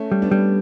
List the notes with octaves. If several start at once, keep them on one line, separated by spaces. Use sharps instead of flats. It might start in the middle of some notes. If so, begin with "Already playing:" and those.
Already playing: A3 C#4
G3
B3 D4
G3